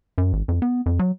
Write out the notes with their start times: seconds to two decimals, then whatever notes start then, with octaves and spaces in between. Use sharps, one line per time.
0.18 F#2
0.33 G#1
0.48 F2
0.62 B3
0.86 F2
0.99 F#3